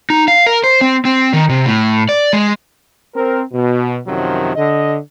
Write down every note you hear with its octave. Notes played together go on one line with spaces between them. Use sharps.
D#4
F5
A#4
C5
C4
C4
D#3
C3
A2
D5
G#3
C4 A#4
B2
F#2 C3 D#3 F3 F#3
D3 D#5